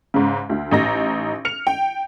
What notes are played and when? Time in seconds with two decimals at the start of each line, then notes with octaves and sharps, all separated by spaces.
0.14 G#2 C#3
0.49 D2
0.71 A1 D#4 A#6
1.45 F6 C#7 F7
1.67 G5